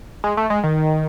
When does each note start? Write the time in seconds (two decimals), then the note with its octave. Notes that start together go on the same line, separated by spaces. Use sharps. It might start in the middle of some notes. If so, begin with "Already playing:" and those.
0.24 G#3
0.37 A3
0.50 G#3
0.64 D#3